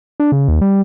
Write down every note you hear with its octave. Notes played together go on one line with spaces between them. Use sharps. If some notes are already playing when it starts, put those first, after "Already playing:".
D4
C#3
D#2
G3